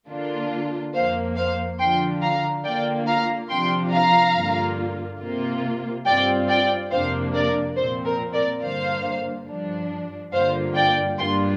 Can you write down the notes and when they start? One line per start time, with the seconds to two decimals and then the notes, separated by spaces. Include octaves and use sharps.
0.08 D3 A#3 D4 F4
0.94 F2 F3 A#3 C5 F5
1.36 C5 F5
1.79 D3 F3 D4 F4 G5 C6
2.22 F5 A#5
2.65 D3 A#3 F4 D5 G5
3.07 F5 A#5
3.50 C3 F3 D4 F4 G5 C6
3.93 F5 A#5
4.36 G2 D3 A#3 F4
5.21 C3 A#3 F4
6.06 G2 G3 C4 F4 D5 G5
6.49 D5 G5
6.91 F2 C3 A#3 D4 C5 F5
7.34 A#4 D5
7.77 A#2 F3 C4 C5
8.05 A#4
8.33 A#4 D5
8.62 G2 D3 A#3 C5 F5
9.47 G2 F3 D4
10.32 G2 D3 A#3 F4 C5 F5
10.75 D5 G5
11.18 G2 G3 A#3 D4 F4 G5 C6